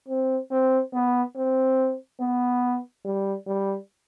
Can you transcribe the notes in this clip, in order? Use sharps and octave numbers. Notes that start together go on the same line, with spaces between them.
C4
C4
B3
C4
B3
G3
G3